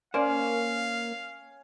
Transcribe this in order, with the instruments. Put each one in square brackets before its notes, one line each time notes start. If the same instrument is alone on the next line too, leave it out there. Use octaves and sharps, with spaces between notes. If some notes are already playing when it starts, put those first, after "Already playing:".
[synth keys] A#3 [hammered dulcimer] C#4 [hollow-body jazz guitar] C5 D5 [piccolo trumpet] F5